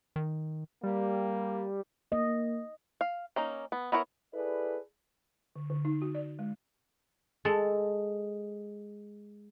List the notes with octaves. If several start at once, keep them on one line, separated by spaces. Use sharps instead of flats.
D#3
G3 A#3
A#3 D#5
F5
A#3 C#4 D#4
B3
B3 E4 A#4 C#5
E4 G#4 A4 B4 D5
D3
D3
D#4
F#4
D5
G#3
G#3 A4